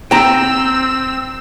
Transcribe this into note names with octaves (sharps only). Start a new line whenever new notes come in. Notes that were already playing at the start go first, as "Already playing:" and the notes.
C4 G5 A#5 E6